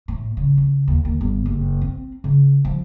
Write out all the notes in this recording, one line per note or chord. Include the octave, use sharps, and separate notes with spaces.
A2
C#3
C#3
D#2
D#2
G1
F#1
C4
C#3
F3